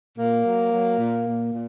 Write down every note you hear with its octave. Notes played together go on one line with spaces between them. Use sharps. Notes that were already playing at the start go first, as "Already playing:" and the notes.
A#2 A#3
F#3
F#3
A#2
A#2
A#2